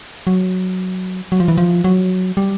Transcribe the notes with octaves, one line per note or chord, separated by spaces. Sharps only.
F#3
F#3
F3
E3
F3
F#3
G3